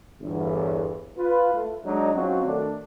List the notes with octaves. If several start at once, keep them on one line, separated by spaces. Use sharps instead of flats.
G1 E2
F4 B4
A3
F#3 G#3 D4 D#4
F#3 C4 C#4 F4 F#4
D#3 A3 D4